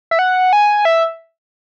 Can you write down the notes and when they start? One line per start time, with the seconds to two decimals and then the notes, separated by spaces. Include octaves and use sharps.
0.11 E5
0.19 F#5
0.53 G#5
0.85 E5